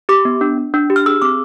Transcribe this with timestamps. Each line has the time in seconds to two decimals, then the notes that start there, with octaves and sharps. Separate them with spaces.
0.09 G4 D6
0.25 B3
0.41 D4
0.58 D4
0.74 D4
0.90 G4
0.96 F6
1.06 G#4 E6
1.22 C4 D6